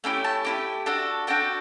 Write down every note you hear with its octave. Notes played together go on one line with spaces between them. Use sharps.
A3 C#4 E4 G4
A5
A3 C#4 E4 G4
D4 F#4 A4
D4 F#4 A4 G5